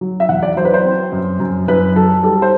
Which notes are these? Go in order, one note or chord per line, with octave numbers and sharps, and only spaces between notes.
F#3
E5
E2 F#5
D5
F#3 C5
B4
C5
C4
F#2
F#2
F#2 B4
F#3 A4
G3 A4
C5